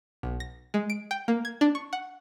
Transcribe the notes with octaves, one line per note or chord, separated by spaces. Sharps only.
B1
A#6
G#3
D7
G5
A#3
G#6
D4
C#6
F#5